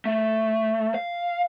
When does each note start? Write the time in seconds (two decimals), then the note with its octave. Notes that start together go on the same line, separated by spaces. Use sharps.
0.05 A3
0.95 F5